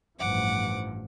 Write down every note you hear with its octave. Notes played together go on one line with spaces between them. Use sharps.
A1 G2 F3 F#5 D6